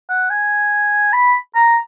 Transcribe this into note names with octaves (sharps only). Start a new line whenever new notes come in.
F#5
G#5
B5
A#5